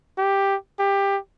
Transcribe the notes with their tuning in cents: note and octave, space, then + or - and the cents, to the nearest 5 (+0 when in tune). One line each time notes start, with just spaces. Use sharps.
G4 +5
G4 +15